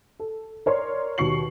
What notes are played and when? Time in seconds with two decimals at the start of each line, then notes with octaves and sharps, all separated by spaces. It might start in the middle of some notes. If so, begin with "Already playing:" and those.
0.20 A4
0.66 A#4 C#5 D5 C6
1.18 D#2 B2 C#6 C7 F#7